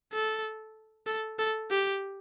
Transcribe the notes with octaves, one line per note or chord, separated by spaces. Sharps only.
A4
A4
A4
G4